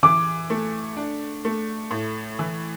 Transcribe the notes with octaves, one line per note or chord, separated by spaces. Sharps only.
E3 D6
A3
D4
A3
A2
E3